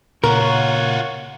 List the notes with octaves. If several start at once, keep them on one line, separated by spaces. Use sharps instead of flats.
A#2 C#3 F4 F#4 A#4 C#5 F#5